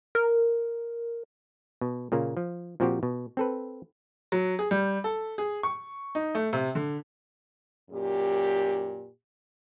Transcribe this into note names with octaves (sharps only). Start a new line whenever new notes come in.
A#4
B2
A#2 C#3 A#3
F3
A#2 F3 C4 F#4 G4
B2
C4 A4 B4
F#3
G#4
G3
A4
G#4
C#6
D#4
A3
C3
D3
F#2 A#2 G4